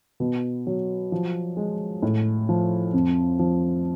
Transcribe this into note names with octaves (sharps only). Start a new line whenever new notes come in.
B2
F#3
F3
G#3
A2
F3
F2
F3